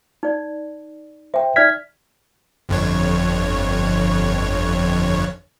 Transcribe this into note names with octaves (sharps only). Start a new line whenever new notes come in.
D#4 D5
C5 E5 G5
D#4 D5 E5 F6 G#6 B6
G1 F2 C#5